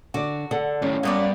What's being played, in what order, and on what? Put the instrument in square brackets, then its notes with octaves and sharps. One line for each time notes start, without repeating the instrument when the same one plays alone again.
[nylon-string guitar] D3 D5 [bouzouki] F#4
[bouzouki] D3 [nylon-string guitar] A4 F#5
[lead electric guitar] D#2 A2 [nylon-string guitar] C#4
[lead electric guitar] G2 [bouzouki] A#3 B3 D5